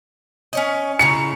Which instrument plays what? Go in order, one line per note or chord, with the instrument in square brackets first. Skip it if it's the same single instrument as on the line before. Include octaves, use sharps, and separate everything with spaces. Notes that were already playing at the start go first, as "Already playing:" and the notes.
[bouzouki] C#4 C#5 D#5
[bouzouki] A2 C#3 A#5 [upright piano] C#7